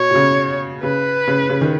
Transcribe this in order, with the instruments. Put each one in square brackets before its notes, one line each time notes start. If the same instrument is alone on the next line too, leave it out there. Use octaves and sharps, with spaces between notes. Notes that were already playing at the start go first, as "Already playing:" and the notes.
Already playing: [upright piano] B2 [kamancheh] C#5
[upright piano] B2
C#3
[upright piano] C#3 [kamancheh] B4
[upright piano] C#3
C#3
D#3